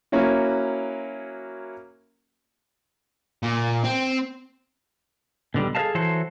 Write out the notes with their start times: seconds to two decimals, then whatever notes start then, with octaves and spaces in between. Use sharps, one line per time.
0.12 F#3 A#3 C#4 E4 F#4
3.43 A#2
3.84 C4
5.54 B2 D3 F3 G3
5.75 G#4 A4 B4 D#5 F5 A5
5.95 E3 F#3 F#4 A4 C5